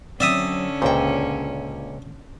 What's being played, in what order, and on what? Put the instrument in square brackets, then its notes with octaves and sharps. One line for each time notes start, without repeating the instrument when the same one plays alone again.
[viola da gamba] D3 C#4 [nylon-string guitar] F#3 C4 [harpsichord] D5 E5 D#6
[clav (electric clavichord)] C#2 A#2 [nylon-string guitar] C5 G5